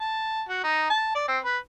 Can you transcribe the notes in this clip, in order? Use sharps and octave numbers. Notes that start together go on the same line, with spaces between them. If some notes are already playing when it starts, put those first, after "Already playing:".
A5
F#4
D#4
A5
D5
C4
B4